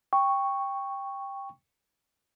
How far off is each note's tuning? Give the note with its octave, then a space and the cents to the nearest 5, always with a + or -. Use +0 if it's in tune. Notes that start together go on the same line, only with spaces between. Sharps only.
G5 +10 C#6 +0